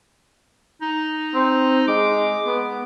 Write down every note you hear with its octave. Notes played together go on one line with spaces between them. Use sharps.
D#4
C4
G#3 D6
B3